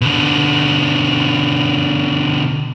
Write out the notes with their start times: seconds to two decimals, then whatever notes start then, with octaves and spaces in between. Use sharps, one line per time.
0.01 B2 D3